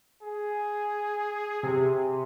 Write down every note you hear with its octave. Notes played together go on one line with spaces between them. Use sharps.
G#4
C3